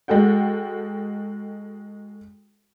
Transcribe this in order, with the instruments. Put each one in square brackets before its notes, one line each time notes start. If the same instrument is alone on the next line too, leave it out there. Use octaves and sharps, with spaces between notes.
[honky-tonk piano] G#3 F#4 A4 F#5 G5